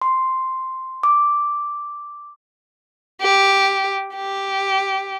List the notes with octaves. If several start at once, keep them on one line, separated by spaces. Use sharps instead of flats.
C6
D6
G4
G4